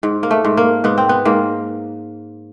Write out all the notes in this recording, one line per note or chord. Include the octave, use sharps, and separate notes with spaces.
G#2
A#3
A3
G#2
A#3
G#2 B3
C4
B3
G#2 A#3